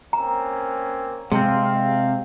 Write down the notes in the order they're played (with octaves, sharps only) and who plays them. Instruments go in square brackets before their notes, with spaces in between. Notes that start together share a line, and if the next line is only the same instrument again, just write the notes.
[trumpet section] A#3 C4 C#4 [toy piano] A#5
[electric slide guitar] C3 C4 [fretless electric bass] G#3 [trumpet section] F5